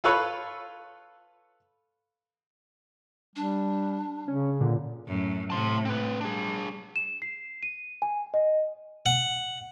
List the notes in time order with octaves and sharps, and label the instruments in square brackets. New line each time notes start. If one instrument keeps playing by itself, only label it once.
[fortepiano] F4 A4 B4 C#5
[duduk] G3 [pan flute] D4
[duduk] C#3 [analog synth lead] C#4
[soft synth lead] A#2 [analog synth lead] D3
[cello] F#2 A2
[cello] A2 C3 [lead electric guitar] A5 C6
[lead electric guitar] C4 B4
[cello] G3 [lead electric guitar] D4 G#4
[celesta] E7
C7
D#7
G#5
D#5
[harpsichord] F#5